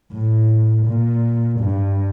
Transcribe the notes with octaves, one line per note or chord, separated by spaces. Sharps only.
A2
A#2
G2